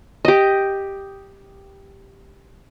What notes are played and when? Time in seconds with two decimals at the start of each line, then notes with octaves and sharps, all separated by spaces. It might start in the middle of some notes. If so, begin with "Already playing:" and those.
0.25 G4 D#5